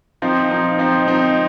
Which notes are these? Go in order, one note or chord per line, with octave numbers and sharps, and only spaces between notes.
F3 C4 D#4
F3 C4 D#4
F3 C4 D#4
F3 C4 D#4